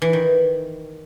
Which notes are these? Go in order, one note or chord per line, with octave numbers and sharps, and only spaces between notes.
E3
D#3